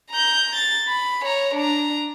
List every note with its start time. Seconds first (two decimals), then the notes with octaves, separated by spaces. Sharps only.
0.11 A#5 G6
0.56 A6
0.88 B5
1.24 C#5 A#5
1.55 D4 A#5